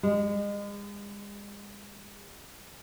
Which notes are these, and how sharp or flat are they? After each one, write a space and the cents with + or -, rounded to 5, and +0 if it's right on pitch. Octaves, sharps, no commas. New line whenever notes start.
G#3 -35